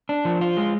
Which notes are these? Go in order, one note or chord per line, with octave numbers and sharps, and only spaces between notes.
D4
F3
F4
G#3